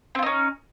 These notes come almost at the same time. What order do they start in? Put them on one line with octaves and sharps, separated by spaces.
C4 F4 D#4 C#4